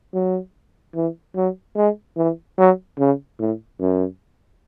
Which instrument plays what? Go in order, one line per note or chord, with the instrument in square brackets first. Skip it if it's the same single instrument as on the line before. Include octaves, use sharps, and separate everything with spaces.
[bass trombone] F#3
E3
F#3
G#3
E3
F#3
C#3
A2
F#2